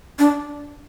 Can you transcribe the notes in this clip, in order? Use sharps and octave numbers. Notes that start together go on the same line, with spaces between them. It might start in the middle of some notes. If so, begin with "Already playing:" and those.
D4